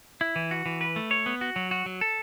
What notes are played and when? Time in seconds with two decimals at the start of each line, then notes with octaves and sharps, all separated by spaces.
0.21 E4
0.36 E3
0.51 F#4
0.66 E3
0.81 B4
0.96 A3
1.11 C#5
1.26 B3
1.41 F#4
1.56 F#3
1.71 F#4
1.86 F#3
2.01 A4